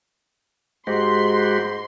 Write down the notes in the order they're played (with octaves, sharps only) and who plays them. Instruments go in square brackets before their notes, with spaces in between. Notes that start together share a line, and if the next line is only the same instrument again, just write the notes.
[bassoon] G#2 [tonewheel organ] G#3 F#4 G4 [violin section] C6